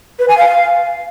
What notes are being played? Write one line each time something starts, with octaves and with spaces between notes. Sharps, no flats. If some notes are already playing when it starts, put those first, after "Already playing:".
B4
G#5
F5